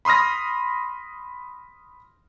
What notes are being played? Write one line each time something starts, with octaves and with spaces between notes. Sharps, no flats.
B5 C6 D#6 F6 A#6